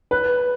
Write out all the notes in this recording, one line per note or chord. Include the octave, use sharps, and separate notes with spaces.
B4